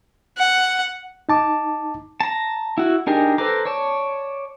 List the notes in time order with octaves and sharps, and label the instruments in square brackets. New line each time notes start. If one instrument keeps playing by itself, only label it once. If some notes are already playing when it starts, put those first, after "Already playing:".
[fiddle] F#5
[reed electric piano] D#4 A5 D6
[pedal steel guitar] A5 A#5
E4 F#4
D4 D#4 G4 G#4 A#4
A4 B4 C5 A#5 D6
C#5 D5 A5